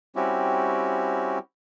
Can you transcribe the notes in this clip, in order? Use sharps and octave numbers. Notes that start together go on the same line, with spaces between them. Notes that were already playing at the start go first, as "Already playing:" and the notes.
G3 C4 C#4 E4 F#4 G4